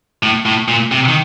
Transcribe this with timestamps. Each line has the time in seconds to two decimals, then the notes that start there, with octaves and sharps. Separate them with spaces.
0.23 A2
0.46 A2
0.68 A#2
0.91 C3
1.08 D#3